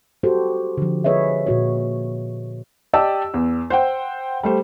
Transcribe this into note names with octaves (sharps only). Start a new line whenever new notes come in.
F#4 G4 A4 C5
D3 F3
G#4 B4 C#5 D#5 E5
A#2 F#4 C#5
G4 D5 D#5 A5 E6
E2
C5 F#5 G5
G3 A3 C5